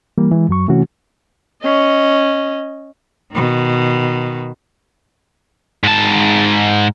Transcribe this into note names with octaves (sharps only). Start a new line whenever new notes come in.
E3 G3 A#3
E3 G#3
F#2 F#3 C#6
C3 E3 A3 C#4 F#4
C#4 D#5
B2 D#3
G#2 A5